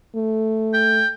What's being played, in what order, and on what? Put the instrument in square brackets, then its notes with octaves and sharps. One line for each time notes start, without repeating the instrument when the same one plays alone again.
[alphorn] A3
[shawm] G5